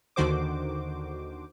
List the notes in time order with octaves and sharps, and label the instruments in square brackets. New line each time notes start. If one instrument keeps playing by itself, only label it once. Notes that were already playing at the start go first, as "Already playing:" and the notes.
[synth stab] D#2 D3 D#3 F#4 C5 D6